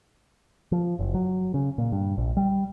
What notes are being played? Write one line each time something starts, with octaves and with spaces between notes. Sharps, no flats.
F3
F#1
F#3
C#3
A#2
G2
A#1
G3